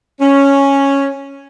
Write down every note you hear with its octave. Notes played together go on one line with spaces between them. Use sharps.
C#4